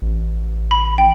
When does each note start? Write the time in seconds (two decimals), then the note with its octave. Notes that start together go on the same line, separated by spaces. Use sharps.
0.02 A1
0.71 B5
0.98 A1 G5